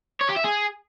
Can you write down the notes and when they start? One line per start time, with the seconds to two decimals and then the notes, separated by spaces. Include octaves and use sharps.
0.21 C#5
0.29 G4
0.36 E5
0.44 G#4